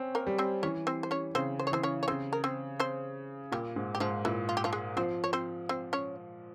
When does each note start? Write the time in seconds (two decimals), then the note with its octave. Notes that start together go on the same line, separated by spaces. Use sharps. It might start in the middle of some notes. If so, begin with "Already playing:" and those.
Already playing: C4 C#4
0.15 A#3 A#4
0.27 G3
0.38 C4 C5
0.63 E3 C#4 C#5
0.87 C4 C5
1.03 C5
1.11 C#4 C#5
1.35 C#3 C4 C5
1.59 C5
1.67 C#5
1.71 E3 C4 C5
1.83 C#4 C#5
2.03 C#5
2.08 C#3 C4 C5
2.33 A#4
2.44 C4 C5
2.80 C4 C5
3.52 A#2 G3 G4
3.76 G#2
3.95 G4
4.00 G#2 F3 F4
4.25 A#2 E3 E4
4.49 F4
4.57 G4
4.64 F3 F4
4.73 G#3 G#4
4.96 F3 C4 C5
5.24 C#5
5.33 C4 C5
5.69 C4 C5
5.93 C#4 C#5